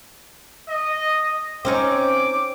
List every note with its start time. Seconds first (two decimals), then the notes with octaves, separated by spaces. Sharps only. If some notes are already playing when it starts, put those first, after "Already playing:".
0.69 D#5
1.65 C4 C#4 D#4 D6